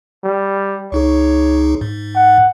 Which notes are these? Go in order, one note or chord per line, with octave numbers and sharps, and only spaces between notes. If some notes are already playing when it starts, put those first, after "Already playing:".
G3
C#2 D#4 G#4 C#5
G#2
F#5